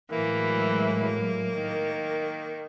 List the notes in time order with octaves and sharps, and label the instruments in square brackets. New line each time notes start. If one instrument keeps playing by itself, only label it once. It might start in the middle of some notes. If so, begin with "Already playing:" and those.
[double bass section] A2 F#3 G#3 [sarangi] E3 [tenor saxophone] A#3
[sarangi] D#3